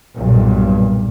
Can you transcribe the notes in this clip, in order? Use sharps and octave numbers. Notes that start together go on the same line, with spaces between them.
B1 G2 A#2